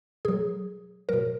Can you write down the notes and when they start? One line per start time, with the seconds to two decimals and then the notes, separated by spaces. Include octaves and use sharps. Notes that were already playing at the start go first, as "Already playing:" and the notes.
0.25 B2 F#3 G#4
1.09 B2 F#3 A#4